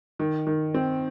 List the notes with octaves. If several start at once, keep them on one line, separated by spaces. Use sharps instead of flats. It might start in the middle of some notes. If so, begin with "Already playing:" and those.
D#3
D#3
C4